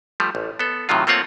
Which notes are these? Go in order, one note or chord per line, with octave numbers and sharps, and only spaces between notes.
F3 G3 A3
A1
B3 A4
A2 C3 D#3 F#3 F4
A3 A#3 C4 F4 C#5 F#5